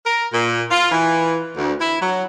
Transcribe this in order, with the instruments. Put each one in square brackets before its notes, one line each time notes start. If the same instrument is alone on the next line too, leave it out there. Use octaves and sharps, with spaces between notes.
[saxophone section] A#4
A#2
F4
E3
D2
E4
F#3